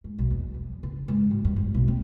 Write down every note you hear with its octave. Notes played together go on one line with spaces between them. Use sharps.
G#2
B1
E2
F2
C#3
G#2
F#3
G2
G#1
B1
C4